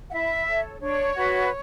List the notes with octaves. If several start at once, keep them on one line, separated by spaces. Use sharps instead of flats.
F#5
E4 E5
A4 C#5
D4 C#5
F#4 B4